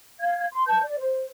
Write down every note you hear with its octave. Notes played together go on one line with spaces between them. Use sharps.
F5 G#6
C6
B4 A5 G6
D5
C5